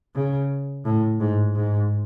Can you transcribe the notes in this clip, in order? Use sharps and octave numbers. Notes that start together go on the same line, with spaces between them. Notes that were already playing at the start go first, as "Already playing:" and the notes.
C#3
A2
G#2
G#2